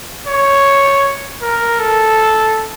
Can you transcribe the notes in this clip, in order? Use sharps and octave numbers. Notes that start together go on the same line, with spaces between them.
C#5
A#4
A4